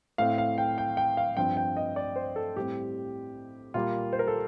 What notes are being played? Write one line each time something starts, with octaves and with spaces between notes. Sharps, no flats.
A2 A3 C4 F5
F5
G5
G5
G5
F5
G2 F3 C4 G5
G5
D#5
D5
C5
A4
A2 G3 C4 G4
A#2 G3 A#3 F4
C5
A#4
A4